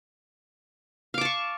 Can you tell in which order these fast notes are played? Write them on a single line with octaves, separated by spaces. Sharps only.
F5 D6 A5 C#6